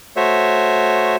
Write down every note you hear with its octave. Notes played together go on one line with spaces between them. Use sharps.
A3 F#4 C5 C#5 E5